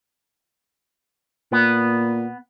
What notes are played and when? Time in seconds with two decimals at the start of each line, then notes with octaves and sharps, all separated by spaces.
1.52 A#2 B3